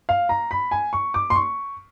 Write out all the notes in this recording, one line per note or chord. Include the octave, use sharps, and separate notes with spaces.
F5
A#5
B5
G#5
C#6
D6
C6
C#6